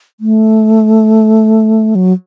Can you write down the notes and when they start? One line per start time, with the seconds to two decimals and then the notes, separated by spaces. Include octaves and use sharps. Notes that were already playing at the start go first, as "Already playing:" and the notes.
0.20 A3
1.95 F#3